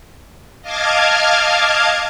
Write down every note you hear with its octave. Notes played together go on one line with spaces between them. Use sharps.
D#5 F5 A5 D6 F6 G#6